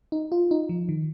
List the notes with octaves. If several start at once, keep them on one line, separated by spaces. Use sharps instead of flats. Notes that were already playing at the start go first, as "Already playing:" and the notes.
D#4
F4
D#4
F3
D#3